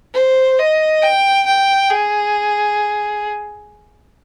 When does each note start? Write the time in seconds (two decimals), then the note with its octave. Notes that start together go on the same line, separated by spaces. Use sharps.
0.14 C5
0.59 D#5
1.02 G5
1.46 G5
1.90 G#4